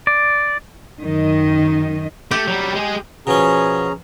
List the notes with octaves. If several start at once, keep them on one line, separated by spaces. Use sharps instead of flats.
D5
F#2 D#3 D#5
A3 G4
F#3 G3
G#3 G#4
B2 F3 C#4 G#4 A#5